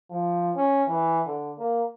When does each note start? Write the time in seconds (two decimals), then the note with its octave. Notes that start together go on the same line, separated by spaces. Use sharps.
0.11 F3
0.56 C#4
0.88 E3
1.26 D3
1.59 A#3